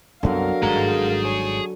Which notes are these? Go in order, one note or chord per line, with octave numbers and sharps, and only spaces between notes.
C2 F#2 D3 F#3 B3 A#4 F5
G#1 G#2 G3 G#4 A#5
C#5 G#5